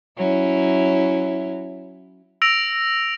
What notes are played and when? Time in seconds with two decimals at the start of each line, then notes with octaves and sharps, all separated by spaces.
0.18 F#3 C#4 E4
2.42 E6 A#6 D7 F7